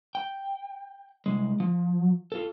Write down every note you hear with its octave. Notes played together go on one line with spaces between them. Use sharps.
G5
C2 G#3
F3
F4 A4